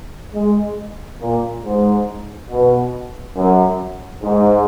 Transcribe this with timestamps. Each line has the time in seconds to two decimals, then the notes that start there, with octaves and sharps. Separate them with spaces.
0.35 G#3
1.22 A#2
1.65 G#2
2.51 B2
3.37 F#2
4.23 G#2